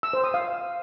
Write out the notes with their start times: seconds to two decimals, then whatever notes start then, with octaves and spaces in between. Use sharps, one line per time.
0.03 E6
0.13 C5
0.24 D#6
0.34 F5